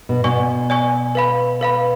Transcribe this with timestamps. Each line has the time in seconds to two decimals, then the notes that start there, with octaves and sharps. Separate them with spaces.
0.09 B2
0.24 B2 D5 G#5 C#6
0.70 D5 G#5 C#6
1.15 B4 F5 B5
1.61 B4 F5 B5